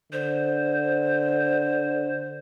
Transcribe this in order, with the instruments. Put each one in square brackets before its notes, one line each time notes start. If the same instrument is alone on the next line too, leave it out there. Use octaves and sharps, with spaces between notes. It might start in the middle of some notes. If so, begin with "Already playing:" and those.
[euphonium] D3 [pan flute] C5